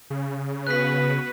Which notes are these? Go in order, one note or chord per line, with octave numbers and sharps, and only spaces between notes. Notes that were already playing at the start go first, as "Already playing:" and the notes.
C#3
B3 F#4 B4 F#6 B6